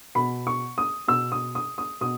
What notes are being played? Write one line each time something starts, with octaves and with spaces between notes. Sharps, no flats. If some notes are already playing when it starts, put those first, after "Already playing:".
B2 B5
C#6
D#6
B2 E6
D#6
D#6
D#6
B2 D#6